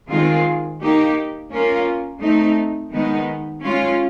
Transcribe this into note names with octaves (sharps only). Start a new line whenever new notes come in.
D#3 G#3 C4 F4 G#4
A#3 D#4 G4
A#3 C#4 F4 A#4
A3 C4 D#4
D#3 G#3 B3 D#4
G#3 C#4 F4